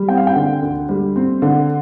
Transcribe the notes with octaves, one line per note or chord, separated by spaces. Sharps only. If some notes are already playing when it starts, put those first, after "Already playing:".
Already playing: G3
C4 G5
F5
G5
D3
D2
G3
C4
D3